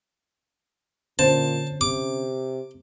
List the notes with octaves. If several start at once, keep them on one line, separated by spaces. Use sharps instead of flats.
A#2 D3 C#4 C5 A5
C3 D6